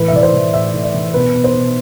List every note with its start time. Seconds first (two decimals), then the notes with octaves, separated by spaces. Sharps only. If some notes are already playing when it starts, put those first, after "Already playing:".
Already playing: A2 E3 B4
0.08 E5
0.13 E3 D5
0.23 C5
0.34 E3
0.53 A2 E5
0.74 A2
0.83 D5
0.94 E3
1.14 B2 B4
1.34 B2
1.44 C5
1.55 B2